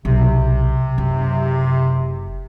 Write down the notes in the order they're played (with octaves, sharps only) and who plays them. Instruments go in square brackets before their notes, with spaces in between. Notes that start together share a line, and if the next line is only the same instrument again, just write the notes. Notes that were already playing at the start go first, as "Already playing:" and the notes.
[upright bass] B1 [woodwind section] C3
[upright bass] F#1